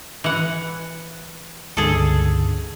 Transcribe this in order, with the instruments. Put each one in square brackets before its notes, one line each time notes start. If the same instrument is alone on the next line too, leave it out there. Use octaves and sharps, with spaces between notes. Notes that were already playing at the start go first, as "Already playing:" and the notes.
[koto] E3 F#5
[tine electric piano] C#2 G2 D3 [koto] G#4 A4